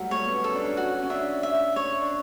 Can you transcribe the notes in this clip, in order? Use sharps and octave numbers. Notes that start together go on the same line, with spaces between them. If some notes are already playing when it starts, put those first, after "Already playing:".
Already playing: F#3 G3 A3 F#5
A3 C#5
B3
C#4
A4
D4
C#4 F#4
C#4
D4 E5
E5
C#5
D4